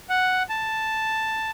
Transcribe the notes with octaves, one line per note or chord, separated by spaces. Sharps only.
F#5
A5